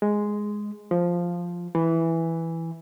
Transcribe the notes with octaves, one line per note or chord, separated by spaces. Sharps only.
G#3
F3
E3